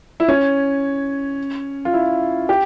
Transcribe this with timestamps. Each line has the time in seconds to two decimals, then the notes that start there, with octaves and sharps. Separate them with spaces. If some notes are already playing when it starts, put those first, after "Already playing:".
0.20 E4
0.28 C#4
1.85 F4
1.93 E4
2.49 G4